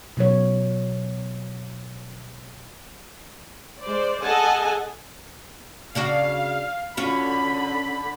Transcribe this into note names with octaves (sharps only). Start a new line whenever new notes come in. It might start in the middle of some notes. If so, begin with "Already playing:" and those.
B2 F#3 C#5
G#3 C5 D5
G#4 A4 D#5 F#5 G#5 A5
C#3 D4 F#4 F5
D3 C#4 F4 F#4 B5